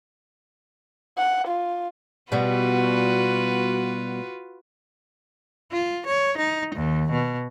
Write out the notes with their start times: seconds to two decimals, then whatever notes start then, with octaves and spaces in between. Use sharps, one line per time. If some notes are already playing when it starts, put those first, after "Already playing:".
1.18 F#5
1.47 F4
2.32 B2 G3 B3 F4 F#4 B4
5.72 F4
6.06 C#5
6.38 D#4
6.75 D#2
7.11 B2